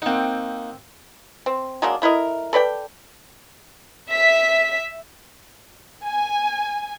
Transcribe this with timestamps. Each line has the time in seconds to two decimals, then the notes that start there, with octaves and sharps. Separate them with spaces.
0.02 A#3 C4 D#4 F#5
1.46 C4
1.82 F#3 G#3 A#3 D4
2.02 A3 E4 A#4 D#5
2.53 A4 B4 D5 G5
4.09 E5 B6
6.06 G#5